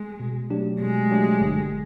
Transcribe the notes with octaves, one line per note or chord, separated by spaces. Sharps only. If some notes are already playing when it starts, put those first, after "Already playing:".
Already playing: G#3
B2
F#3 A3 D4 G4
B2 G#3
F#3 A3 D4 G4
G1